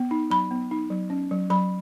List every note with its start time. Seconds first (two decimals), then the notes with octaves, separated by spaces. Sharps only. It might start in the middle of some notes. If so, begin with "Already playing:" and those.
Already playing: B3
0.11 D#4
0.30 F#3 B5
0.51 B3
0.71 D#4
0.90 F#3
1.10 C#4
1.31 F#3
1.50 F#3 B5